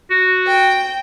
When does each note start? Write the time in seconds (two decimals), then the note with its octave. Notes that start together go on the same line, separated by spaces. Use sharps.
0.10 F#4
0.47 G5